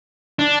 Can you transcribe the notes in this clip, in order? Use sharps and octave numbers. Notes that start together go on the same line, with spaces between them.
D4